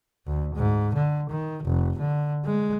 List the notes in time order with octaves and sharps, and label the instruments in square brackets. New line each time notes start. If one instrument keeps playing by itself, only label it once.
[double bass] D2
G#2
D3
D#3
F1
D3
G#3